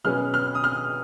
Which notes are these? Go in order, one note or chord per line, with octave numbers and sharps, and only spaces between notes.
B2 F#3 C#4 G#4 B4 F6
F6
D#6
F6